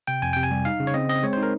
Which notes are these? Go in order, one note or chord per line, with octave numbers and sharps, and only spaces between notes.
C3 G5
F2 G#5
C3 G5
G#5
G3
D#4 F5
C#3
C#5
C4 D#5
C4 D#5
G#3 C#5
D#4 C5
A#4